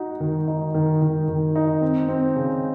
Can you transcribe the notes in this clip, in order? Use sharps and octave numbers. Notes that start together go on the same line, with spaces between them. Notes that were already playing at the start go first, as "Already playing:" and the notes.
Already playing: D#4 F#4
D#3
D#4
D#3
D#3
D#3
D#4
C4
C4
C#3